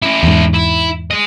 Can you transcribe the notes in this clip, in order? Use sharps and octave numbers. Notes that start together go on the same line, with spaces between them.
C#4 E4
E2 G#2
E4
G#3 D#5